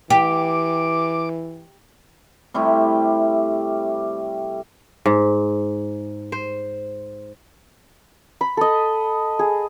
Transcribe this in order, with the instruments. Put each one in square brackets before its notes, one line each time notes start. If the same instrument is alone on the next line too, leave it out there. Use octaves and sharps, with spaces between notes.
[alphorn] E3 [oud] G4 [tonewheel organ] D6
[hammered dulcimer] C3 G3 A3 E4
[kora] G#2
C5
[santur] B5
A4 D#5
G#4